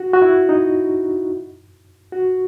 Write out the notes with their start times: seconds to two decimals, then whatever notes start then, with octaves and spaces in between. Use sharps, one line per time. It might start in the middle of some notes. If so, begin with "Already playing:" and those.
Already playing: F#4
0.14 F#4
0.22 E4
0.49 D#4
2.13 F#4